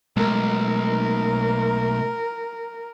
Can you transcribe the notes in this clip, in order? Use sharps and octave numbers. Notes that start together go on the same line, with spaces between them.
B1 G#3 A3 A#4